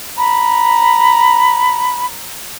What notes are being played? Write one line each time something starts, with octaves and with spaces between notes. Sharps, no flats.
A#5 B5